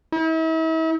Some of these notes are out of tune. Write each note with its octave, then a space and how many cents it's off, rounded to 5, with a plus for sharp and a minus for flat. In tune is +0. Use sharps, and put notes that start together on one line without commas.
E4 -40